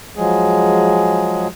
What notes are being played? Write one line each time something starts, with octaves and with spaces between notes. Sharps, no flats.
F3 F#3 G#3 G#4